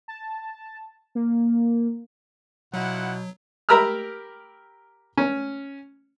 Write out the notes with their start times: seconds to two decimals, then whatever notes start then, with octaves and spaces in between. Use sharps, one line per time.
0.08 A5
1.15 A#3
2.74 B2 F#3 E4 F4 F#5
3.69 G4 A#4 A#5 B5 E6 F6
5.17 C#4